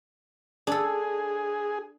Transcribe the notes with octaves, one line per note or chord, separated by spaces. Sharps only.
D4 G#4 A4